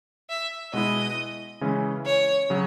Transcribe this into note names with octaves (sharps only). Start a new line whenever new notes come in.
E5
B2 G#3 B3 E4 D#5
C#3 E3 G#3 C#4 E4
C#5
C#3 F#3